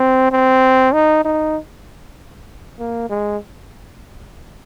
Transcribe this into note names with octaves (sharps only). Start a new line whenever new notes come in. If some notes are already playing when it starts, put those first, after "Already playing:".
Already playing: C4
C4
D#4
D#4
A#3
G#3